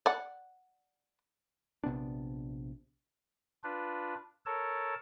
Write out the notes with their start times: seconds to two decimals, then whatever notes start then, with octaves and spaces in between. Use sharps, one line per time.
0.06 D5 F#5
1.84 A#1 C3 B3 D4
3.64 D4 F4 B4
4.46 A4 A#4 C#5 A5